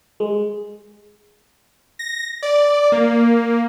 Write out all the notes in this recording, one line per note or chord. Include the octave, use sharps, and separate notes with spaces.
G#3
A#6
D5
A#3